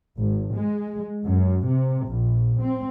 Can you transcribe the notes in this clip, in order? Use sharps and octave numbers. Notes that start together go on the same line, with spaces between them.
G#1
G#3
F#2
C3
A#1
C4